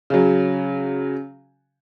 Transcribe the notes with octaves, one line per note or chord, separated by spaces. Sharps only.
C#3 F#3